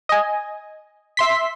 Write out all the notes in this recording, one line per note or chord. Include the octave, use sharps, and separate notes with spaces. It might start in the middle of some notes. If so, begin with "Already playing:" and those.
D#5 G#5
E5 C6 B6